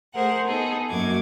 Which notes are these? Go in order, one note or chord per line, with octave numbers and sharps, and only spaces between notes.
A3 G#4 A#4 C5 F#5
B3 D#4 G#4 A4
F#2 A#3 F#4 D6 G#6